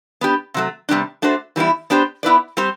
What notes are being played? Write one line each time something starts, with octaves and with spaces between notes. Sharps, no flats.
B3 D4 G4
C3 F#3 A3
C3 G3 B3 D4
A3 D4 F#4 C5
E3 G3 B3 E4
B3 D4 G4 C5
B3 E4 B4 D5
G3 C4 G4 C5